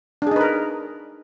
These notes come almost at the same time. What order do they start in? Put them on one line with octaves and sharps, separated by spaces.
D4 G#4 D#4 B4 A#4